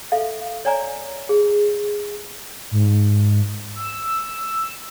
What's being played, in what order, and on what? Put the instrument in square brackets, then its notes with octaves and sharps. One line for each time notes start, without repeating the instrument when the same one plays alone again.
[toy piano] A4 E5 F5
C#5 D5 G#5 A#5
G#4
[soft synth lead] G#2
E6